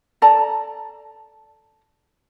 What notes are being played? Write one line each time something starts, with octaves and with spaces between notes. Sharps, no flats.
A4 D5 A5 A#5